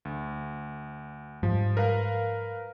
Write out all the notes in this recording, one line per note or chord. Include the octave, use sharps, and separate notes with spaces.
D2
G#2 F3 G3
A#4 B4 F5